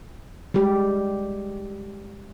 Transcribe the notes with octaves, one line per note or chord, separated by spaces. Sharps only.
G3 G#3 G4